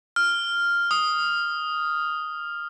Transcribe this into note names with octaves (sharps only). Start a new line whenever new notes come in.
F6
D#6